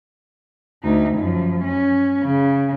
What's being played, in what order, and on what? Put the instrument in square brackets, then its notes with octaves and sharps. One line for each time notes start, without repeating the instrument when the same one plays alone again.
[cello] D2 D#4
F#2 F3
C#4
C#3